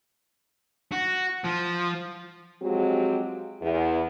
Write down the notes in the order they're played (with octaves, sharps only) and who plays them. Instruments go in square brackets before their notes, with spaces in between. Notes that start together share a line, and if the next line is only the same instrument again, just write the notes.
[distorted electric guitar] F#4
F3
[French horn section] F3 F#3 G#3 C4 F#4 G4
E2